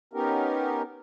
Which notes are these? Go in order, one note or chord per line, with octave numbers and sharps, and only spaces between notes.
B3 C#4 D#4 G4 A#4